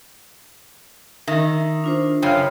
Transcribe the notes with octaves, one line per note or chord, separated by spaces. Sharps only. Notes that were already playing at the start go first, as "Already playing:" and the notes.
D#3 E5
D4 F4 C5
F#2 C#3 C#5 G5 F6